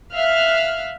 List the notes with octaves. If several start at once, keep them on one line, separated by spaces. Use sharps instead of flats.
E5 F5 F6 F#6